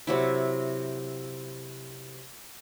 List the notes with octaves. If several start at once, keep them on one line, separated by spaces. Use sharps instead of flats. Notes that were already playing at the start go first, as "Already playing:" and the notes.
C3 F#3 E4